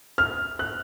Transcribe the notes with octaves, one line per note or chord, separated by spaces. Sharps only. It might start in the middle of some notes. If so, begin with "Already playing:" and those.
F6
F#6